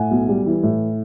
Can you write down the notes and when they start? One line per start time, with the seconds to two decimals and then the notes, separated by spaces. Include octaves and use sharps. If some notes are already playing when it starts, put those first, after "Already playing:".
Already playing: A2 F#5 G#5
0.11 B1
0.29 G3
0.46 E3
0.63 A2